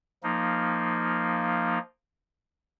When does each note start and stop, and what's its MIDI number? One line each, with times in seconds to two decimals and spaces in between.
0.23 1.79 53
0.23 1.79 58
0.23 1.79 63